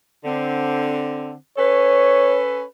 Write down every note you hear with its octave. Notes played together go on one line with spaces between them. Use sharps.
D3 C4
C#4 A4 B4 C#5